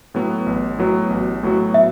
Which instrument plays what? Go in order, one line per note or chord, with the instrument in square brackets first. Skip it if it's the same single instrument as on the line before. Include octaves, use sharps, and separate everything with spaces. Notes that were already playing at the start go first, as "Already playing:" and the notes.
[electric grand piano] A2 F#3 B3 F#4
A1
A2 F#3 B3 F#4
A1
A2 F#3 B3 F#4
[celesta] E5